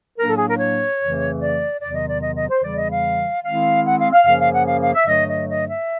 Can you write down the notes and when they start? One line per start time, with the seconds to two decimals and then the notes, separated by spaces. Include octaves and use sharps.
0.18 A2 F#3 A#3 D4 A#4
0.28 A4
0.38 G#4
0.49 A#4
0.59 C#5
1.00 F2 C#3 E3 A3
1.40 D5
1.81 E2 C3 D#3 F#3 D5
1.94 D#5
2.08 D5
2.22 D#5
2.36 D#5
2.49 C5
2.62 E2 C#3 E3 G3 D5
2.76 D#5
2.90 F5
3.44 D#3 G#3 C4 E4 F5
3.85 F#5
3.99 F5
4.12 F5
4.25 F#2 C#3 F3 A#3 C#4 F5
4.39 F5
4.53 F#5
4.66 F5
4.81 F5
4.94 E5
5.07 G2 D3 F#3 A3 D#5
5.28 D#5
5.49 D#5
5.68 E5